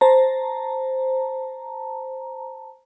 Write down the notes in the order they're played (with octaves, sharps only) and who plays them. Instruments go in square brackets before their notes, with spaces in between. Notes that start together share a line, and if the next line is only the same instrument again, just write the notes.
[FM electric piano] C5 A5 A#5